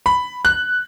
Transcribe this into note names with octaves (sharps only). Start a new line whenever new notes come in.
B5
F#6